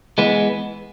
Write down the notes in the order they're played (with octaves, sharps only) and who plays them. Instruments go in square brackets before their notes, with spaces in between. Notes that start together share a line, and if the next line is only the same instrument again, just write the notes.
[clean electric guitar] E3 G#3 B3